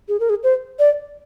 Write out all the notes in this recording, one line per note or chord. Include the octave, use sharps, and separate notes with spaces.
G#4
A#4
G#4
C5
D5